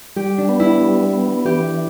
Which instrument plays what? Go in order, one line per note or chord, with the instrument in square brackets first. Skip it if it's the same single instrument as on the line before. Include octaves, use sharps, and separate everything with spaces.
[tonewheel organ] G3 [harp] G4
[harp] D4
[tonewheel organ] B3
[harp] E4
[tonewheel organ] G3
B3
[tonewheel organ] E3 [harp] G4